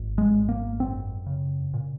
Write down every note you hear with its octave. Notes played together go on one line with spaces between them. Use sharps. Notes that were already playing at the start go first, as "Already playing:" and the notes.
Already playing: G#1
G#3
G#1
A#3
F#2 C4
C#3
A#2